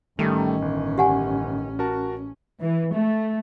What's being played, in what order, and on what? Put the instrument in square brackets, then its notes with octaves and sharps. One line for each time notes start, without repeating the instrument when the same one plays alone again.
[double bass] A1 C#4 [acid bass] D#3 [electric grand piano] G3 A3
[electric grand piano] G1
[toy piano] G4 F#5 G#5
[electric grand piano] F#4 A#4 A5
[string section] E3
A3